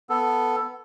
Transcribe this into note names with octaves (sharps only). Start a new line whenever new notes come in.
B3 A4